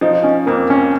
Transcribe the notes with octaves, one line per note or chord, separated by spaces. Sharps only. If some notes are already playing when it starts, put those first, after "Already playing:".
F3 D#4
C#4
F2 A#3
C#4